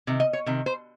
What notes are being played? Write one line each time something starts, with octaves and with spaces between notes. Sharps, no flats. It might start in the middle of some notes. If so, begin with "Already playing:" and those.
C3 D#3
D#5
C#5
C3 D#3
C5